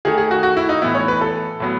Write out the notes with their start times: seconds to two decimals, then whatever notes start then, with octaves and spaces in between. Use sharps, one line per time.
0.05 D#3 A3 G#4
0.18 G#4
0.31 F#4
0.43 F#4
0.57 E4
0.69 D#4
0.82 A2 E3 B3 E4
0.95 C#5
1.08 B4
1.21 A4
1.60 A2 F#3 B3